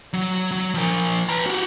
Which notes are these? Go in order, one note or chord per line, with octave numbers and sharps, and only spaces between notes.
F#3
F#3
F3 A#4
B4 A#5
F#4 G4